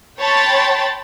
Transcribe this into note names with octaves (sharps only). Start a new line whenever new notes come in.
C#5 G5 A5 B5 C6 A6